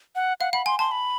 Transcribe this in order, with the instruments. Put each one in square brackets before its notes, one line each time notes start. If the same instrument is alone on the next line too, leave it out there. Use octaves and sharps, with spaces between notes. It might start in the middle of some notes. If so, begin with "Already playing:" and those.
[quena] F#5
[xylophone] F5 [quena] F#5
[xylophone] F#5 [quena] B5
[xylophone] G#5 [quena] C6
[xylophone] A5 [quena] C6
[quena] B5